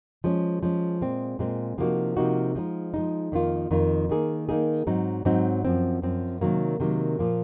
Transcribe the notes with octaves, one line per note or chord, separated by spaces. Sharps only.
F3 G#3 C#4
F3 G#3 C#4
A#2 G#3 C4
A#2 G#3 C4
C3 F3 A#3 D#4 F#4
C3 F3 A#3 D#4 F#4
F3 G#3 D#4
F3 G#3 D#4
F2 D#3 A#3 F4
F2 D#3 A#3 F4
D#3 A#3 D#4 G#4
D#3 A#3 D#4 G#4
G#2 F#3 C4 D#4
G#2 F#3 C4 D#4
F#2 F3 C4
F#2 F3 C4
C3 D#3 F#3 A#3
C3 D#3 F#3 A#3
A#2 F3 A#3